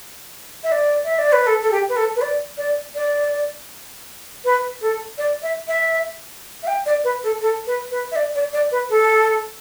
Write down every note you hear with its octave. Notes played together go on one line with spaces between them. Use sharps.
E5
D5
E5
D5
B4
A4
A4
G4
B4
A4
B4
D5
D5
D5
B4
A4
D5
E5
E5
E5
G5
D5
B4
A4
A4
B4
B4
E5
D5
D5
D5
B4
A4